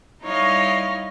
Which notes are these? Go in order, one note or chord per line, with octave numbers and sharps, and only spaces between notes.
G3 D#4 E4 C#5 D#5 F5